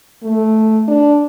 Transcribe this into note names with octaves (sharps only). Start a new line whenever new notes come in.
A3
D4